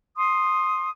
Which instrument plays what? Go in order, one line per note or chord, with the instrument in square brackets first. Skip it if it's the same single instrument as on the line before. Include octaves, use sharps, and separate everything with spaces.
[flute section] C6 D#6